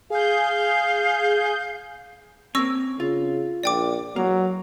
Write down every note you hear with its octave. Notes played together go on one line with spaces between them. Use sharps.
G#4 F5 G6
A#3 C4 C#4 C#6 E6 A#6
C#3 F4
A#1 D5 G5 D6
E1 F#3 A#3